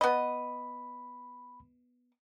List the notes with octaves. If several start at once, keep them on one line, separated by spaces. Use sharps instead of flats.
B3 D#5 B5